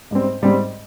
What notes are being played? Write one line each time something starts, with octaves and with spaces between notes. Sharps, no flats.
G#2 G3 C4
G#2 G3 C4